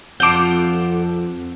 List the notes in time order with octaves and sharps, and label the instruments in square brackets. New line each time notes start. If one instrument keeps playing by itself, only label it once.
[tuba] F2 [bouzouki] F4 A4 F#5 [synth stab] D6 G6